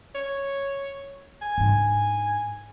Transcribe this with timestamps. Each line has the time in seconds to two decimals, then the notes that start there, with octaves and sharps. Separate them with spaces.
0.15 C#5
1.42 G#5
1.58 G#2 D4